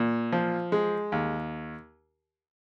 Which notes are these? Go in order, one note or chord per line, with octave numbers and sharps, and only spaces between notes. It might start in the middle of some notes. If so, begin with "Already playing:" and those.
Already playing: A#2
F3
G#3
D#2